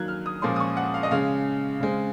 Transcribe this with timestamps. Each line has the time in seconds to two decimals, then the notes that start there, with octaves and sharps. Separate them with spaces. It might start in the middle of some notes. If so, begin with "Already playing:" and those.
Already playing: D#3 F#3 A#3 F#6 G#6
0.08 F6
0.26 D#6
0.42 A#2 F3 G#3 C#4 C6
0.56 D#6
0.60 C#6
0.77 F#5
0.94 F5
1.03 D#5
1.11 C#3 G#3 C#4 F5
1.80 C#3 G#3 C4